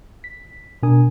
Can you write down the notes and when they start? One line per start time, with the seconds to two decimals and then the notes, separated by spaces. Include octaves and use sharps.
0.24 B6
0.83 B2 D4 A#4 G#5 D#6